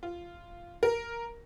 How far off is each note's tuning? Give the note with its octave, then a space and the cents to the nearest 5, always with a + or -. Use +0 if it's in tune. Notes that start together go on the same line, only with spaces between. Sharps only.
F4 -10
A#4 +0